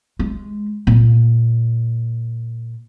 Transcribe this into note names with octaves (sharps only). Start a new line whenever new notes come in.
G#3
A#2